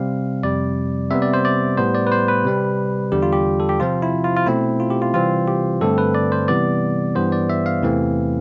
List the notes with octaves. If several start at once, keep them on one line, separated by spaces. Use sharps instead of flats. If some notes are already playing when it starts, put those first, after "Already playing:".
Already playing: C3 G3 C4 F5
F2 C3 G3 D5
C3 G3 B3 E5
D5
C5
D5
A2 G3 B3 C5
D5
B4
C5
B4
C3 G3 C4
E2 D3 G3 G4
F4
G4
A4
G4
C3 F3 C4 F4
E4
F4
F4
B2 A3 C4 E4
F4
G4
F4
C3 E3 G3 C4 F4
G4
G2 D3 A3 C4 A4
B4
D5
C5
C3 E3 G3 B3 D5
G2 E3 G3 B3 C5
D5
E5
F5
E2 C3 E3 A3 C4